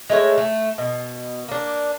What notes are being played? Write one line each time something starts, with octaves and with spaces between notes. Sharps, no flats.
G#3 A3 B4 C#5
A3
B2
A#3 D4